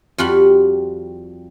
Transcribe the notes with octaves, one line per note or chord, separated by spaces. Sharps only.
F2 G3 F4 F#4 B5